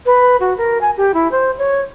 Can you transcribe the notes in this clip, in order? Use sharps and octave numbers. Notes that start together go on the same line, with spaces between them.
B4
F#4
A#4
G#5
G4
E4
C5
C#5